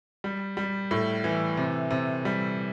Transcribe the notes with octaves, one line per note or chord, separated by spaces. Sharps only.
G3
G3
A2
E3
C3
C3
G3